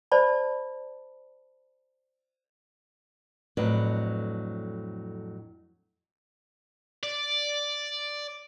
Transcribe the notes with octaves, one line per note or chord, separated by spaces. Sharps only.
C5 D5 A5 B5
F2 A2 F#3 D4 B4
D5